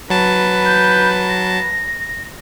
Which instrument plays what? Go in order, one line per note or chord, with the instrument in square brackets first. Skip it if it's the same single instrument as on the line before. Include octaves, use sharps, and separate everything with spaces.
[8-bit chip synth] F#3 A5 [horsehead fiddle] B4
[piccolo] G6
A#6